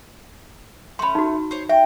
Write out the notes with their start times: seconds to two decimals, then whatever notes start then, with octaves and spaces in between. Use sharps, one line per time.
0.99 A3 C#4 B5 C6
1.15 D#4 F#4
1.51 C5 C#5
1.69 E5 G5